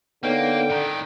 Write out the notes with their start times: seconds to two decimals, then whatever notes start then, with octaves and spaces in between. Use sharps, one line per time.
0.23 D3 A#3 B3 D#4 C#5 G5
0.70 A2 D#3 D5 A#5 G6